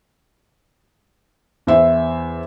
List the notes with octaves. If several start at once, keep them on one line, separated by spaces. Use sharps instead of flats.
E2 C5 E5 C6